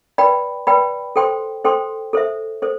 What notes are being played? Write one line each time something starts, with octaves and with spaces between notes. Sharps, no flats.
B4 D5 G5 B5
B4 D5 G5 B5
A4 C5 G5 C6
A4 C5 G5 C6
A4 C5 E5
A4 C5